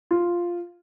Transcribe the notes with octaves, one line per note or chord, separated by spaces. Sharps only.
F4